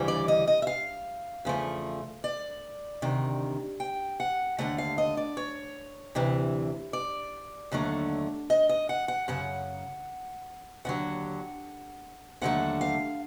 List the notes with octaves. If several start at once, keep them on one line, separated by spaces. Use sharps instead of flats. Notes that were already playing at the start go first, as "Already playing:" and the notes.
Already playing: D2 C#3 E3 G3
D5
D#5
D#5
E5
F5
E2 C#3 F3 A3
D5
D2 C3 D#3
G5
F#5
D#2 D3 F#3 A3 F#5
F5
D#5
D5
C#5
D2 C3 E3
D5
D#2 D3 F#3 A3
D#5
D#5
F#5
F#5
F#2 C#3 F#5
D#2 D3 F#3 F#5
D#2 D3 F#3 A3 F#5
F5